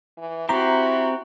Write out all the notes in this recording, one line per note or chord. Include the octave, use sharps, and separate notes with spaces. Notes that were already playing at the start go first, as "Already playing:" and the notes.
E3
C4 E4 F#4 G4 A#5